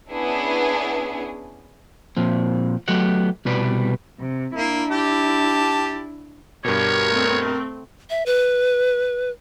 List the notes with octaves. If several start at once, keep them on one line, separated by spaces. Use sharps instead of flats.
B3 C#4 D4 E4 G#4
A#2 F3 C4
F#3 A3 B3 G4 D#5 F#5
C2 B2 G3 B4 D5
C3
A#3 D4 E4
G4 A5
G2 B2 G4 A#4 C#5
A3 C4
E5
B4